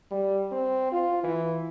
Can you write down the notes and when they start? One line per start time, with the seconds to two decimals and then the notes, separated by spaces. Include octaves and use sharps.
0.11 G3
0.52 C4
0.92 F4
1.23 E3